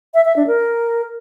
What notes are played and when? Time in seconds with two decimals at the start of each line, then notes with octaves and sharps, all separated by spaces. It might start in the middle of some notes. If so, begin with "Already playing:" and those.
0.14 E5
0.25 E5
0.36 D4
0.47 A#4